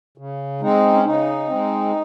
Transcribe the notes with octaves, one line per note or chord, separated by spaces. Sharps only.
C#3
G#3 C4 D#4
C#4
C#3 D#4
G#3 C4